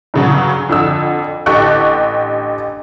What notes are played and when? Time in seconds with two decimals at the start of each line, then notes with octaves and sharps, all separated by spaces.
0.14 G2 C#3 F#3
0.69 F2 D3 E6
1.46 A1 D3 G4 A4 C#6 F#6